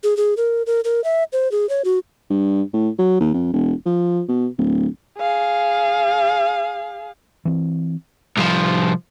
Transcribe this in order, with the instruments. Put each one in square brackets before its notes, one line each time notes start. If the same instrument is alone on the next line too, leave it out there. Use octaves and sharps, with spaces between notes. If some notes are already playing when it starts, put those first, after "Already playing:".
[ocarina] G#4
G#4
A#4
A#4
A#4
E5
C5
G#4
C#5
F#4
[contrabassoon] G2
A2
F#3
D#2
F2
E1
F3
B2
D1
[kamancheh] G#4 F5
[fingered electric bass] E3 C4
[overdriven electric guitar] C2 F3